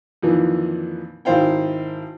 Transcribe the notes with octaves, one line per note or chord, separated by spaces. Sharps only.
F2 A#2 D#3 E3
G#1 D#3 E4 C5 F5 G5